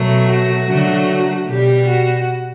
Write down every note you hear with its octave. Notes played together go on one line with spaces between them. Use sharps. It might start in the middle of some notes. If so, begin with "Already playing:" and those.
Already playing: B2 F#3 A3
F#4
D3 F#3 A3
B2 G3 G4
F#4